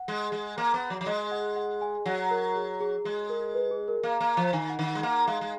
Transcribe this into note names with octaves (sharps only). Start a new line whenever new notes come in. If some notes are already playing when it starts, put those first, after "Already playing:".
Already playing: F#5
G#3
G#3
A#3
B3
F#3
F#3
G#3 D#5
F#5
F#5
G#5
F#3 F#5
A#4
G#4
G#4
G#3 G#4
A#4
B4
G#4
A#4
A#3 F5
A#3
F3
D#3 G#5
F#5
D#3
F#5
G#3
A#3 F#5
G#3 F5
G#3